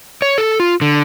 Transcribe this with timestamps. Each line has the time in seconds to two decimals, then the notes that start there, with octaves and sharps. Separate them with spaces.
0.22 C#5
0.38 A4
0.60 F4
0.81 D3